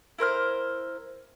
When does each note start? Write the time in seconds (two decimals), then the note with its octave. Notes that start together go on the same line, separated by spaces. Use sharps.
0.18 E4 A#4 C5 F6